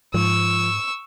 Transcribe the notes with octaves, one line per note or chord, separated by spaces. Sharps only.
G#2 F3 C#6 E6